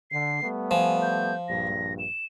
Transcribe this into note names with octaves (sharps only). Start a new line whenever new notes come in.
D3 C7
G3 A3 B3
F3 G#5
G6
A#1 G2 A#6
E7